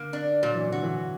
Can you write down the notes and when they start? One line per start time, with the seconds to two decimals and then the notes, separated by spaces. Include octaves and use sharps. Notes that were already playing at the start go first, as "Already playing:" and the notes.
Already playing: D3 A#3
0.13 D4
0.42 A#2 F#3
0.56 E3
0.69 D3 F#4
0.83 E3